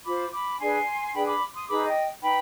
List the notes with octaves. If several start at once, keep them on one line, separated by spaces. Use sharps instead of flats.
F4 C5 B5 D6
B5 D6
D4 G#4 B4 G#5 C6
D4 G#4 B4 G5 B5
B5 D6
C6 D#6
D#4 G#4 B4 B5 D6
D#5 G5
D#4 B4 G5 B5